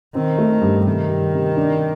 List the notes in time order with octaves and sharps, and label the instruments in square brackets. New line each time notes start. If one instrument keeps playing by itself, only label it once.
[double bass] D#3 [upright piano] C4
[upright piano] A3
G2
[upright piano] C3 [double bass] D#3
[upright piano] G3
C3
D4